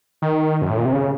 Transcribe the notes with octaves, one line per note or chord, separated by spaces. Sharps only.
D#3
F#2
A2
A#2
C3
C#3